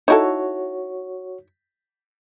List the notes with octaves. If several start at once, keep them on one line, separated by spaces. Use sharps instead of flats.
D#4 E4 F#4 A4 C#5